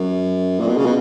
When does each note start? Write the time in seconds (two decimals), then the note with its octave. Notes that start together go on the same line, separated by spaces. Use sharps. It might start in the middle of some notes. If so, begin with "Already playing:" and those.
Already playing: F#2
0.59 A#2
0.67 B2
0.77 C#3
0.86 B2